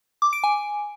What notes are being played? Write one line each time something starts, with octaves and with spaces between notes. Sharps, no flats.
D6
D7
G#5